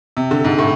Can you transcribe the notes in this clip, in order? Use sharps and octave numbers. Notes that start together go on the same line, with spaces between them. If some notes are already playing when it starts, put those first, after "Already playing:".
C3
D3
G#2
A2